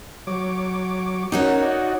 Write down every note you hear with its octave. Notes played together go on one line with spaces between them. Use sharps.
F#3 C#5 D6
C#4 D#4 F#4 A#4 C#5 F#5
D5 D#5 F#5